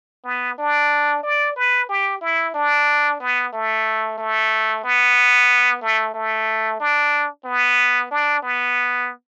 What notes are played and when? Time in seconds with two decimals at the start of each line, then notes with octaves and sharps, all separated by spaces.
0.25 B3
0.58 D4
1.23 D5
1.56 B4
1.89 G4
2.21 E4
2.54 D4
3.20 B3
3.53 A3
4.18 A3
4.84 B3
5.82 A3
6.14 A3
6.80 D4
7.45 B3
8.11 D4
8.43 B3